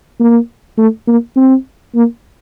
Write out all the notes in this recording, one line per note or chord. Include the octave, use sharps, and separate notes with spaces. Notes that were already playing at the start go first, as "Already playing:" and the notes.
A#3
A3
A#3
C4
A#3